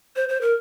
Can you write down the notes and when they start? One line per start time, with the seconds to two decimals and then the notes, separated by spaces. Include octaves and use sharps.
0.16 C5
0.29 C5
0.41 A#4